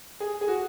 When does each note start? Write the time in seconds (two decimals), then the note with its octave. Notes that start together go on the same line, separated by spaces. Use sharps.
0.20 G#4
0.41 G#4
0.48 F#4